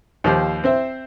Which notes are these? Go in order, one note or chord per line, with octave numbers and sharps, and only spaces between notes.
D#2 F3 G4 C5
C4 C5 E5